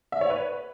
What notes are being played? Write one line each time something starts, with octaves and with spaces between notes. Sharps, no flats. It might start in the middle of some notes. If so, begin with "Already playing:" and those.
E5
C#5
B4